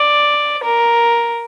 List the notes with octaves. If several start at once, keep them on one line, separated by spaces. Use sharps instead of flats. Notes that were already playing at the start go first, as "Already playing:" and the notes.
Already playing: D5
A#4